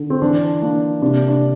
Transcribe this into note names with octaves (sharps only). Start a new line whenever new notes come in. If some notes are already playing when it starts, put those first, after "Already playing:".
Already playing: D3
C4
E3 D4
A#3 D4
C3 D4
D4